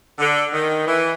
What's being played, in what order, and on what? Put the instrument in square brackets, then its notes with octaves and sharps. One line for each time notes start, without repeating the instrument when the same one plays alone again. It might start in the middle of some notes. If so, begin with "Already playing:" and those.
[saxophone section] D3
D#3
E3